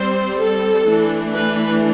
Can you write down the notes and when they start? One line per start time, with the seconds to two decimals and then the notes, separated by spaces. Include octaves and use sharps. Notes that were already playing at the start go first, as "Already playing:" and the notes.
Already playing: G3 C4 C5
0.40 A4
0.88 E3 A3 D4
1.34 B4